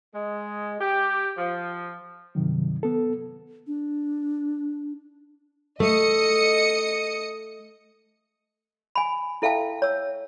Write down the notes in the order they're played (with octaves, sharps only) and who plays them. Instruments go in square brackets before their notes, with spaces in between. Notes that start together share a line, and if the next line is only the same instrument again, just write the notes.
[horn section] G#3
G4
F3
[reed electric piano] G2 C3 D#3 F#3
B3 A4
[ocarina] D4
[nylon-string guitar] A3 [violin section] D#5 D#6 C#7
[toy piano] G#5 B5
E4 A4 E5 F5 G5 A5
C#5 E6